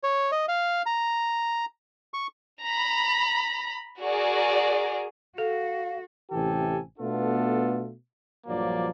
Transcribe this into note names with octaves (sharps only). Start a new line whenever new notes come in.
C#5
D#5
F5
A#5
C#6
A#5 B5
F#4 G#4 A#4 D5
F#4 A4 F5
A1 C3 E3 G4 A4 G#5
B2 A3 B3 D4 F4 A4
A#1 G2 F3 F#3 A#3 D5